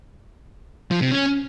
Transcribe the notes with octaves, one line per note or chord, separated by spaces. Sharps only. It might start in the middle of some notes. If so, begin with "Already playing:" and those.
F3
C3
C#4